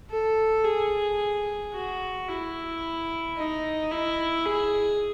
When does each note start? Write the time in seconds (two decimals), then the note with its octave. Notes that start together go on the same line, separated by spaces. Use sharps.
0.10 A4
0.64 G#4
1.73 F#4
2.28 E4
3.37 D#4
3.91 E4
4.46 G#4